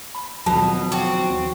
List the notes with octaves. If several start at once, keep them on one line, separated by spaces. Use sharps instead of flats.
B5
D#2 B2 F3 F#3 A5
C4 F#4 D6